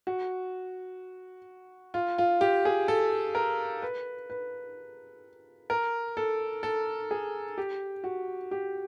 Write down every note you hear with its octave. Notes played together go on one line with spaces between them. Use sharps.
F#4
F4
F4
G4
G#4
A4
A#4
B4
B4
A#4
A4
A4
G#4
G4
F#4
G4